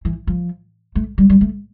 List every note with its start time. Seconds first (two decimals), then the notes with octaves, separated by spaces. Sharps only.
0.05 E3
0.27 F3
0.95 A3
1.18 G3
1.30 G3
1.41 A3